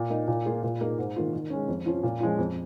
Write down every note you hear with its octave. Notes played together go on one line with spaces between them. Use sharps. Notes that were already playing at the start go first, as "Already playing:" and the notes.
Already playing: A#2
A#3 D#4
A#2
A#3 F4 G#4
A#2
A#3 D#4 G#4
G#2
D#3 A#3 F4
D#3
G#3 C#4
F2
F3 C#4 F4
A#2
F3 G#3 C#4 F4
F2